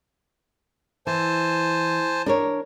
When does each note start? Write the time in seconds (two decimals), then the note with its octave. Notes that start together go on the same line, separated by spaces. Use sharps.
1.07 E3 C5 G#5 A5
2.26 D4 A#4 C#5